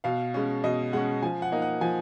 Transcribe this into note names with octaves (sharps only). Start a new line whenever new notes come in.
B2 F5
G#3 C#4
B2 D#5
G#3 C#4 F#5
F3 G#5
F#5
A#3 D#4
F#5
F3 G#5